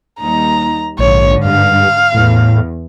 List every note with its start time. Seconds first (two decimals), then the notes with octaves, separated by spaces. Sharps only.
0.20 D#2 G3 D#4 A#5
0.99 A#1 G#2 D3 C#5
1.45 G2 F5
2.14 E2 A2